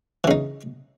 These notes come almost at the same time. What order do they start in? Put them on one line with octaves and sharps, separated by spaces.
E3 C#3 D#4